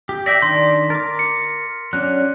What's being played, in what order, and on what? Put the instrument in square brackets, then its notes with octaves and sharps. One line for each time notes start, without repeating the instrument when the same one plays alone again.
[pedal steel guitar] G4
[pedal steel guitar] D5 E5 G5 [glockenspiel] A#6 B6
[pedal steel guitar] D#3 D4 [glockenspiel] C6
[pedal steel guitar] A#4 D6 [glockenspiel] A6
[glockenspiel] C#7
[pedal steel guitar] F#3 C#4 D4 [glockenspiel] F#6